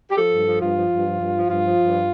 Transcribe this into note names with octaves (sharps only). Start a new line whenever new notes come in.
G4
F3 A4
G2
F3
G2 F4
F3
G2
F3
G2
F3
G2 F4
F3
G2